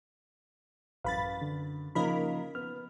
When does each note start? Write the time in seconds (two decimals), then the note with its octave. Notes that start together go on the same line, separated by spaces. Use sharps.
1.05 A1 F#2 B4 F5 B5 A6
1.42 D3
1.95 C#3 F3 A#3 D#4 A#4 B5
2.55 B3 F6